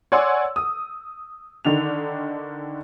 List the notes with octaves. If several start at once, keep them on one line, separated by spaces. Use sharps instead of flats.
C#5 D5 F#5 G#5 C6 E6
D#6
D3 D#3 D4 F7